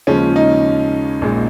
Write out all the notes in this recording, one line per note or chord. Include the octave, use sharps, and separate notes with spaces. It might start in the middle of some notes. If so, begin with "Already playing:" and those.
D#2 C#3 F3 G#3 C#4
D#4
A#1 A#2 G#3